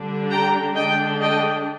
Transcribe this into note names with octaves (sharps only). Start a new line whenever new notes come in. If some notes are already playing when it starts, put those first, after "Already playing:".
Already playing: D3 G3 D4
G5 A#5
D3 G#3 D4 D#5 G5
D#5 G5